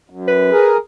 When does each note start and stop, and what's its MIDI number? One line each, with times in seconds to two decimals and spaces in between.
0.10 0.50 42
0.28 0.71 71
0.52 0.77 68
0.52 0.77 70